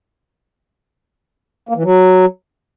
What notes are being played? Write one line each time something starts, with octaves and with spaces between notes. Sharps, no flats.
A#3
E3
F#3